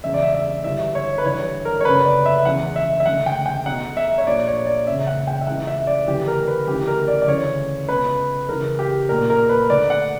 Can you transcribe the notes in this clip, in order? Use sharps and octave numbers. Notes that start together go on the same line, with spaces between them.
E1 E2 C#3 E5
D5
E5
E5
G1 G2 E3 E5
C#5
B4
G1 G2 E3 C#5
A#4
C#5
F#1 F#2 D3 B4
D5
E5
E1 E2 C#3 E3 F#5
E5
E5
E1 D2 C#3 F#5
G5
G5
B1 B2 F#5
E5
C#5
A#1 A#2 D5
C#5
D5
F#1 E2 C#3 E5
F#5
G5
E5
C#2 C#3 E3 F#5
E5
D5
D2 C#3 E3 G4
A#4
B4
D2 C#3 E3 G4
A#4
D5
D5
D2 C#3 E3 C#5
C#2 B2 B4
C#2 C#3 E3 A#4
G4
B1 A#2 A#4
A#4
B4
D2 D3 D5
F#5